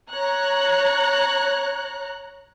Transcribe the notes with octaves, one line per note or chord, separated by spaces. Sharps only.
C#5 A#5 F#6